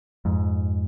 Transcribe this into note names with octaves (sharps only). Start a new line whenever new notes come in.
F2 G#2